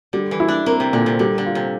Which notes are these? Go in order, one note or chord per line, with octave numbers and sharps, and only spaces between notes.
D3 G3
E3
E4
D4
A#3 C4
C3
A#2 D3
C3
D3 G3
D3
F4
C3